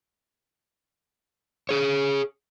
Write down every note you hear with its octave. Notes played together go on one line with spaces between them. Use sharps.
G#4 C#5